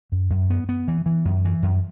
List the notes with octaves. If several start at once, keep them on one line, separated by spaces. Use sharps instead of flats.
F#2
F#2
B3
B3
E3
E3
F#2
E3
F#2